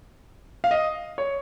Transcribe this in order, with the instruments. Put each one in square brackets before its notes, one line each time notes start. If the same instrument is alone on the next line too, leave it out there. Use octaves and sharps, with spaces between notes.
[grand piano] F5
D#5
C#5